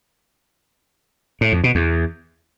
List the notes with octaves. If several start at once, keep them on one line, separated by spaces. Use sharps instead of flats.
A2
F2
B2
E2